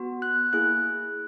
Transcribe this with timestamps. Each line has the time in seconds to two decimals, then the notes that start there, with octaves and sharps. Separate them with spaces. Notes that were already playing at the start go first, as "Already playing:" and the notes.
Already playing: B3 F#4
0.22 F#6
0.53 A#3 E4 G#4 F#6